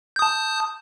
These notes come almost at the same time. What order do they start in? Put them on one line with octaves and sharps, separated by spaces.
G6 D#6 A5